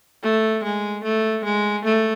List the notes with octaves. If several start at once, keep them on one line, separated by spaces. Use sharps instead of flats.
A3
G#3
A3
G#3
A3